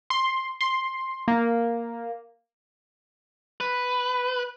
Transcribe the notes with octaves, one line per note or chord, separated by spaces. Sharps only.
C6
C6
A#3
B4